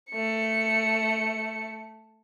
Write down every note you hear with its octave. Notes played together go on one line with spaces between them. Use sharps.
A3 C#7